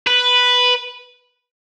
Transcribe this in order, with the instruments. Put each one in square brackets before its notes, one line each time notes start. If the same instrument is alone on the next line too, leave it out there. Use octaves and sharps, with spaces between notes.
[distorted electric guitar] B4